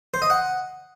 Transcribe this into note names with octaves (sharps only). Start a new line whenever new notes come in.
C5
D#5
F#5